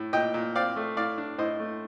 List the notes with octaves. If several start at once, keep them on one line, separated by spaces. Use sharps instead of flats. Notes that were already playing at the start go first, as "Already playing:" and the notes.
Already playing: A2
A#2 D#5 G5
A#2
C4 D5 F5
A3
A2 D5 F5
D4
A2 C5 D#5
A3